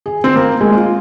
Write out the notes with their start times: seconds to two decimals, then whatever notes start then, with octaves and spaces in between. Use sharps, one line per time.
0.06 G#4
0.24 C4
0.36 A#3
0.61 G#3
0.75 F4